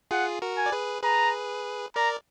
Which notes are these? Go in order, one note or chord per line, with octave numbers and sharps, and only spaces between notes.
F4 G#4 F#5
F#4 A#4
G#5
D5
G#4 B4
G#4 B4 A#5
A#4 D5 A#5